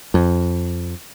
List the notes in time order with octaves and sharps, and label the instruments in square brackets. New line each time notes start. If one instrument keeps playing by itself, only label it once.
[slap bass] F2